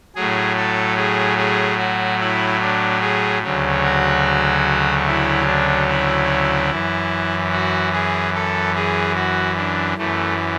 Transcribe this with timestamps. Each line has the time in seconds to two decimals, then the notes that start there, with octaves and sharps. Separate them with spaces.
0.16 A2 F#3 G#4
0.57 A4
0.97 G#4
1.38 G#4
1.79 F#4
2.20 E4
2.61 D4
3.01 G#4
3.43 D2 C#3 F#3
3.84 F#4
5.07 E4
5.47 D4
5.88 E4
6.71 F#2 E3
7.53 F#4
7.93 G#4
8.35 A4
8.76 G#4
9.15 F#4
9.57 D4
9.98 F#2 E3 A3